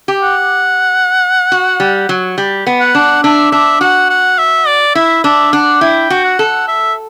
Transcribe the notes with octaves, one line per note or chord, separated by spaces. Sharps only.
G4
F#5
F#4
G3
F#3
G3
B3
F#5
D4
D4 E5
D4 E5
F#4 F#5
F#5
E5
D5
E4 E5
D4 E5
D4 F#5
E4 G5
F#4
F#5
A4
E5